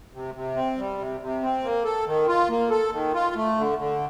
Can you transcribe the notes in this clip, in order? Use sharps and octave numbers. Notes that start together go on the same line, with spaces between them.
C3
C3
C4
G3
C3
C3
C4
A#3
A4
D#3
F4
A#3
A4
D#3
F4
A3
D3
D3